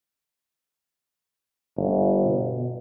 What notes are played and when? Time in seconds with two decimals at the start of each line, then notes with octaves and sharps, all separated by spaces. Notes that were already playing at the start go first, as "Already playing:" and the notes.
1.77 G1
2.26 B2